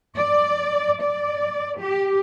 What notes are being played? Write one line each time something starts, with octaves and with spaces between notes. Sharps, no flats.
D5
D5
G4